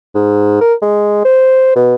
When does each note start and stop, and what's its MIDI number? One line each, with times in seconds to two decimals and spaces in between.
0.15 0.61 44
0.61 0.74 70
0.82 1.21 56
1.25 1.75 72
1.76 1.95 47